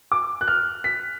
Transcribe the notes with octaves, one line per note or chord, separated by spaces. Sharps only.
D6
F#6
F6
B6